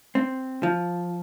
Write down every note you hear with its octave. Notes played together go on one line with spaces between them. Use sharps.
C4
F3